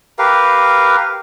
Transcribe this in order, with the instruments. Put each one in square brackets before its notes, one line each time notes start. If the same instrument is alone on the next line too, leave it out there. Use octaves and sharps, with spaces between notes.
[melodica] G4 A#4 B4 F5